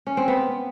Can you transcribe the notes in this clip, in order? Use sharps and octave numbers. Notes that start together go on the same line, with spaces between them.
C#4
C4
B3